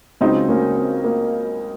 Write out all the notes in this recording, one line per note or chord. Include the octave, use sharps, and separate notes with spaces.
C#2 C#3 F#3 C4 D#4
A#3 C#4
C4
A#3